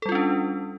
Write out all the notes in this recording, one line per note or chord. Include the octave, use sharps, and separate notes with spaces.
G3 C#4 D4 F4 A4